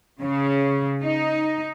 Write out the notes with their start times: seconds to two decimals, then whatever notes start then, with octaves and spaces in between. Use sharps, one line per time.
0.21 C#3
1.03 D#4